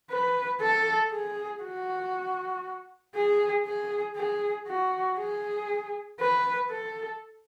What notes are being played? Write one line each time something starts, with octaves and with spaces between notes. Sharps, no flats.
B4
A4
G#4
F#4
G#4
G#4
G#4
F#4
G#4
B4
A4